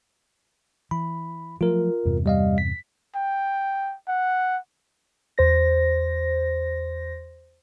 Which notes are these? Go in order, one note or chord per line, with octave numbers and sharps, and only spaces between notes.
E3 B5
F3 F#3 A3 F4 A#4
E2 G2 C3
G3 D#5 F5
B6
G5
F#5
E2 C5 A#6